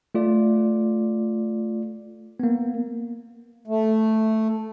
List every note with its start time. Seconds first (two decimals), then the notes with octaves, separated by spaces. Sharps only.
0.15 A3 F4 D5
2.40 A#3 B3
3.67 A3